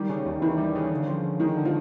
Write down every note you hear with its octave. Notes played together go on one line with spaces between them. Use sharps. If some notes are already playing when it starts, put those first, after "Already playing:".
Already playing: D#3 G3
C#3
D#2
D#3 E3
G3
C#3
D3
F3
D3
D#3 G#3
D3
F3